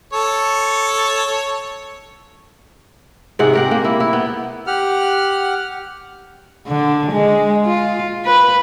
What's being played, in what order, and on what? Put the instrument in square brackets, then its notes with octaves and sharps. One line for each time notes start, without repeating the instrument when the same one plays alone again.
[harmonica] A4 C#5
[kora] G#2 C3 G#4 F#5
G4 A#4 F#5
A#3
E4
E4
B3
[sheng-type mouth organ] G4 F#5 F6
[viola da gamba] D3
G#3
F4
B4